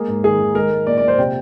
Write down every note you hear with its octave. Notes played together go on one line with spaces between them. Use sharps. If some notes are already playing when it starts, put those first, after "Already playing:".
Already playing: G#3 A#3 G#4
G#2
D#3 G#4
D#3
G#3 A#4
G#3
A#2 D5
D5
A#2
C5
C3 G5